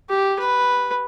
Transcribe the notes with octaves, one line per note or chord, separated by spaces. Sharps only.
G4
B4